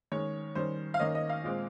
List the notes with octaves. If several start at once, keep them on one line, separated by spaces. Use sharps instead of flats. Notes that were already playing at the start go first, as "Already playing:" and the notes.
D#3 G#3 C#4 C#5
D#3 G3 C#4 C5
F5
D#3 A#3 C#4 D#5
D#5
F5
A#2 G#3 C4